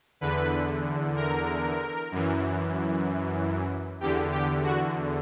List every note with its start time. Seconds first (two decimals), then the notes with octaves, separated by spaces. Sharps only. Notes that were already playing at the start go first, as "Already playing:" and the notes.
0.21 E2 D3 B4
1.16 A#4
2.11 F#2 E3
4.01 E2 D3 G4
4.32 G4
4.64 F#4